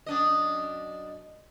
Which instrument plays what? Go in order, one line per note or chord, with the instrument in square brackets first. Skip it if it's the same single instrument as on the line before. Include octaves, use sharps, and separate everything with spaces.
[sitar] F#2 D4 D#5